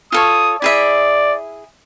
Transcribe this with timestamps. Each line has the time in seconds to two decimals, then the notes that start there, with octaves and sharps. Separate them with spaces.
0.12 F4 A4 C#5 D#6
0.62 E4 G#4 D5 E5